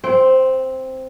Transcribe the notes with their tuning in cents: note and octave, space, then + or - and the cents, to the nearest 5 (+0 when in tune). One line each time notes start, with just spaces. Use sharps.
C4 +0 G5 -30